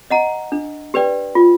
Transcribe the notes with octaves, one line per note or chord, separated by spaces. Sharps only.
D#5 F#5 A#5
D4
G4 B4 D5 G5
F4